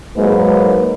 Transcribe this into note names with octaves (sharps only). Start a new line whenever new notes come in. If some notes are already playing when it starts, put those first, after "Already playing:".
G#2 F#3 G#3 A#3 B4